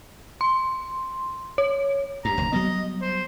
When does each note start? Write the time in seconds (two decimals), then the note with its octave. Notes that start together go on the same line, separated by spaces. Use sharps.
0.41 C6
1.58 C#5
2.25 G2 A#5
2.38 F1 D2
2.53 F#3 G3 B3 D#5
3.01 C5